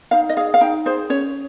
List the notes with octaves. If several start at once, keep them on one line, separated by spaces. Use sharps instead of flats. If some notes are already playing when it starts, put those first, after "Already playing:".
D#4 F5
D#5
G#4 F5
F5
D#4 G5
G#4 C5
C#4 C#5